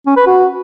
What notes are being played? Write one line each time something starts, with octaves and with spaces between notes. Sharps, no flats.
C#4
B4
F#4